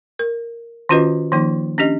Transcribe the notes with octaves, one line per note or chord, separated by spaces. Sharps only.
A#4
D#3 C#4 F4 F#4 B4 D#5
D#3 F3 A#3 D#4
C#4 D4 G4 D#5